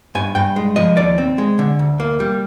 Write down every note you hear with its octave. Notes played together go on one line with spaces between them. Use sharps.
G2 G#5
G2 G5
G#3
F3 D#5
D#2 D5
C4
G#3
D3
D2
A#3
G3